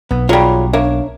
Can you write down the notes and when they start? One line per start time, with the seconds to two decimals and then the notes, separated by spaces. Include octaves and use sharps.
0.11 B1 B3
0.29 F#3 G3 F4 G#4 C#5
0.73 A#3 D4 C#5 E5